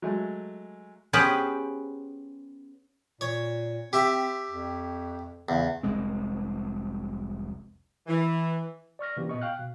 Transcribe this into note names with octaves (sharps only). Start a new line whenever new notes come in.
F#3 G#3 A3
B3 C#4 G4 G#4 B4 C5
A#2 C#5
C4 G4 E5
F2
E2 C#3
F1 C2 G#3 C4
E3
D5 C#6 F6 A#6
C3 E3 A#3 C#4 G4
A#2 B3 D#5 C#6
F5 G5 F6 F#6
B2